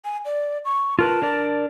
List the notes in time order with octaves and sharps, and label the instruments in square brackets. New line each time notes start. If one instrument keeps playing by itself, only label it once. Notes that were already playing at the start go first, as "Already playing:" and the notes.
[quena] G#5
D5
C#6
[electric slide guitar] F4 A#4 B4 [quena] A5
[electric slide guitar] D4 A#4 D5